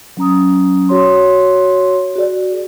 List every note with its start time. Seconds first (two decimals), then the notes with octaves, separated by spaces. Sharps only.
0.17 F#3 C#4 A#5 D#6
0.89 F#4 C#5 C6
2.16 F#4 G#4 D5